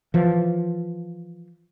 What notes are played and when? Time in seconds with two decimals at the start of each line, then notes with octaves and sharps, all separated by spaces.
0.14 E3 F3